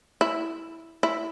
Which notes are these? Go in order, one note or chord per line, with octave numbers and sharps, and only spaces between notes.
E4
E4